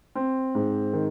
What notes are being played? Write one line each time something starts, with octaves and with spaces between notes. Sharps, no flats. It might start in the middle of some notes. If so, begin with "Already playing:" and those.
C4
G#2
D#3